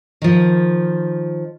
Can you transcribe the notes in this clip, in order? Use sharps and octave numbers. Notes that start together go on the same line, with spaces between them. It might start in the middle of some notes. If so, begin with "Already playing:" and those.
D#3 F3